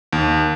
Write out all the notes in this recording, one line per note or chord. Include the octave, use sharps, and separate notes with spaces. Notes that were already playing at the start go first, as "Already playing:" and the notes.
D#2